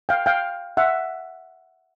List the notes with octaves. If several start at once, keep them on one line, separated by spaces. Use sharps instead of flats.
F5 G5
F5 G5
E5 F#5